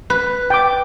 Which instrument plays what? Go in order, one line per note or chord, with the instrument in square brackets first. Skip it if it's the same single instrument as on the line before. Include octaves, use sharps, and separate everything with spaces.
[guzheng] B4
[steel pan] G5 D6